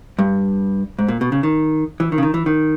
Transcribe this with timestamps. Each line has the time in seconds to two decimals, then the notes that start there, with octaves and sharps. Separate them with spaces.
0.19 G2
0.99 G#2
1.08 A#2
1.21 B2
1.32 C#3
1.43 D#3
2.00 E3
2.12 D#3
2.18 C#3
2.23 D#3
2.34 E3
2.46 D#3